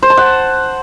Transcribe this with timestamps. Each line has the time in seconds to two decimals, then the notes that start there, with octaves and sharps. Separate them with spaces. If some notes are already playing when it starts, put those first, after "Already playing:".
0.03 C5
0.10 A5
0.17 F#5